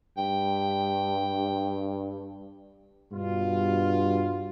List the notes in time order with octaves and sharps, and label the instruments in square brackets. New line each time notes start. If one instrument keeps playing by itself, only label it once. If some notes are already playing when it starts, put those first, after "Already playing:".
[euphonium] G2 [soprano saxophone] G5
[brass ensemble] G2 B2 F4